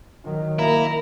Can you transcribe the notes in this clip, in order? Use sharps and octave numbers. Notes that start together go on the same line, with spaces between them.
D#3 F#3
A#3 E4 A#5